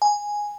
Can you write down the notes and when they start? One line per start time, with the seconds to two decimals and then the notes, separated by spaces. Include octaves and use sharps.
0.02 G#5